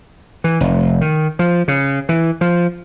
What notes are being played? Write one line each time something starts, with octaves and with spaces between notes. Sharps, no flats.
E3
F1
D#3
F3
C#3
E3
F3